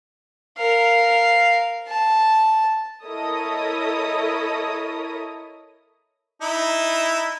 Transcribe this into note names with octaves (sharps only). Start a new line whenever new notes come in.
A#4 F5
A5
E4 A4 A#4 C#5 D#5 D#6
D#4 E4